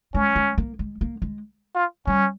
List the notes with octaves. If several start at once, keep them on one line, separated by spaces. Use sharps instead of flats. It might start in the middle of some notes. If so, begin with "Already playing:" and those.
G#3 C#4
G#3
A#3
G#3
A#3
G#3
F4
G3 C#4